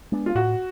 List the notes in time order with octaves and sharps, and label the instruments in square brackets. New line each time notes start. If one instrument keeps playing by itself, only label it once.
[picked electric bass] G#3 B3 D4
[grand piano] F4
[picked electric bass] A2 [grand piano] F#4